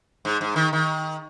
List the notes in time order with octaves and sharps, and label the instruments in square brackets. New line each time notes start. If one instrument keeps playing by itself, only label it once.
[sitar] G#2
G#2
D#3
D#3